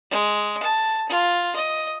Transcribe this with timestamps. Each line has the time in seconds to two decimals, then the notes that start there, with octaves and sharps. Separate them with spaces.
0.11 G#3
0.62 A5
1.09 F4
1.56 D#5